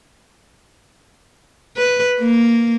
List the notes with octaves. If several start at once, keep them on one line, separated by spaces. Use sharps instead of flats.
B4
A#3